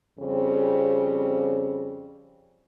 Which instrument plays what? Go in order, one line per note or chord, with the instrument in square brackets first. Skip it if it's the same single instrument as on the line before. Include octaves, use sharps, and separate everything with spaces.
[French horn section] F2 C#3 G3 C4